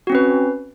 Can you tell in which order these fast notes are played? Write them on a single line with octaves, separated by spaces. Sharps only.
F#4 C4 C#4 B4